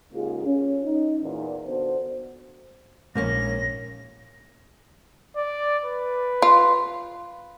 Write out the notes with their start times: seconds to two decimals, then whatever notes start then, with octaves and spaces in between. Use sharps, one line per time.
0.13 G#2 C#3 A#3 F4 G4 G#4
0.45 C#4
0.85 D#4
1.23 E2 A#2
1.66 D3 B3 F#4 C5
3.15 A#1 G#2 A#3 C#4 A#6
5.37 D5
5.84 B4
6.42 F4